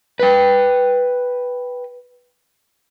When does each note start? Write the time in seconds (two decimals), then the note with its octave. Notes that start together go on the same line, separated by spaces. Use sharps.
0.20 B4 G5